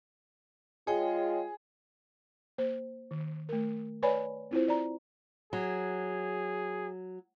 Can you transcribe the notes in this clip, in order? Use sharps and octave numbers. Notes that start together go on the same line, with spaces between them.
G#3 F4 G#4 C#5 G5
A#3 C5
D#3
A3 A#4
B4 C#5 D5 G#5 B5
C4 E4 F4 C5
D5 A#5
F#3 G#4